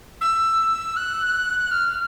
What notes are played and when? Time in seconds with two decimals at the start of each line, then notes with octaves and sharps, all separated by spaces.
0.21 E6
0.96 F#6
1.71 F6